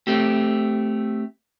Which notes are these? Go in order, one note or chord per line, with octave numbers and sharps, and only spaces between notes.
A3 C4 G4